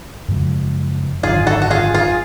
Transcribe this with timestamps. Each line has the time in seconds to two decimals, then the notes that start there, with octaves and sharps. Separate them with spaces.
0.28 F#2 C#3 F3 G#3
1.23 G#1 F#2 D3 F4 G#4
1.47 F#4 A4
1.62 F#4
1.70 F4 G#4
1.94 F4 G#4